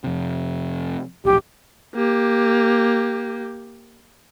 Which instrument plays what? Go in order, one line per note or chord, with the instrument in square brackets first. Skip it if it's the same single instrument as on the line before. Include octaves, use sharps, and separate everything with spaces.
[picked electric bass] F2 C3
[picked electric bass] D1 A#1 [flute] G4
[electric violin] A#3 G4